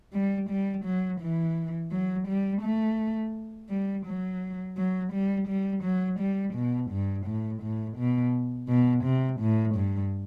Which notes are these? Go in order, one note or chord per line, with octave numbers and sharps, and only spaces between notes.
G3
G3
F#3
E3
F#3
G3
A3
G3
F#3
F#3
G3
G3
F#3
G3
B2
G2
A2
A2
B2
B2
C3
A2
G2